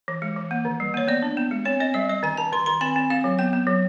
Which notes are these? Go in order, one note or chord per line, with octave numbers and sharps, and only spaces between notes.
E3
G#3
E3
A#3
D#3
G3
A#3 C#5
B3 D5
D4
B3
G#3
C4 C#5
C4 D#5
G3 E5
G3 D#5
D#3 G#5
D#3 A5
D#3 C6
D#3 C6
C4 B5
C4
C4 F5
F#3
B3 G5
B3
F#3